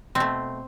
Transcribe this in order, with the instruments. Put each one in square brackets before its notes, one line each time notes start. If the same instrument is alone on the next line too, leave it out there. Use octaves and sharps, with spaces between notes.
[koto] B2 A3 C4